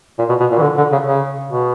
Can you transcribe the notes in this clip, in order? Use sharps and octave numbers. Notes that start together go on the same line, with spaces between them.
A#2
B2
B2
A#2
E3
D3
D3
C#3
C#3
B2